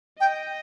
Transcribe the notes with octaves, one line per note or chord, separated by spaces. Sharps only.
D#5 G5